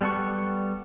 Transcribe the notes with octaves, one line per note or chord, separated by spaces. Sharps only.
G3 B3 A4 F#5 C#6